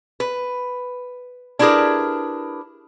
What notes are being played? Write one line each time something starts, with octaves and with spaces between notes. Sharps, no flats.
B4
D4 E4 G4 G#4 A#4 B4